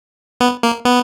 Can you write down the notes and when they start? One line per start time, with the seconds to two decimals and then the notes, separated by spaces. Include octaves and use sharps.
0.41 B3
0.63 A#3
0.85 B3